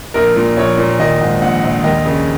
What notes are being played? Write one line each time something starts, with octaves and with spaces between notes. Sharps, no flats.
A#1 A#4
A#2
A#1 C#5
A#2
D#3 D#5
G#2
A#1 F#5
A#1
D#2 D#5
C#3